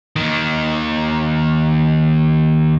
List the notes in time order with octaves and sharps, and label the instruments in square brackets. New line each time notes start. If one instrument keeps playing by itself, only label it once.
[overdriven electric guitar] D#2 D#3